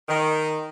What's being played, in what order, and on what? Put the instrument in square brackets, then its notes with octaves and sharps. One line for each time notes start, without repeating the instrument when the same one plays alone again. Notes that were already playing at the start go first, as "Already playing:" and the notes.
[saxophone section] D#3